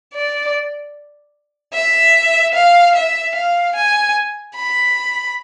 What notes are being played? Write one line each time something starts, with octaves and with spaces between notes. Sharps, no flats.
D5
E5
F5
E5
F5
G#5
B5